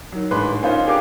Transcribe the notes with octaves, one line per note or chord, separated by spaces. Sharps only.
D#3 F#3
A1 G#2 G#3 D4 B4 C6
A#3 C#4 D#4 F4 C5
D4 G4 G#4 A#4 F5 D6